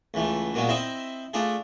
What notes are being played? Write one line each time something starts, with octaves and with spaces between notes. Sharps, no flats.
C#2 E3 A3
A#2 F#3 G#3 B3
C4 E4 C5 D#5 E5
A3 D4 F4 G#4